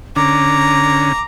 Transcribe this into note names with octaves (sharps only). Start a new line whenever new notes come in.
D3 C#4 A#5 D6